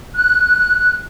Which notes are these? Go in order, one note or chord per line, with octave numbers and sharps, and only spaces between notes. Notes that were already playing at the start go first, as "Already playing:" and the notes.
F#6